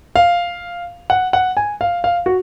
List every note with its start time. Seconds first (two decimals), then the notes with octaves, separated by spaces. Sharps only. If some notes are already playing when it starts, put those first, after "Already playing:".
0.16 F5
1.10 F#5
1.33 F#5
1.57 G#5
1.81 F5
2.04 F5
2.26 F#4